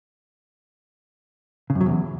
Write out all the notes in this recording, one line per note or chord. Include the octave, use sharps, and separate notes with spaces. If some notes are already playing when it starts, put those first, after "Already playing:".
C#3
F#2
F#3
E2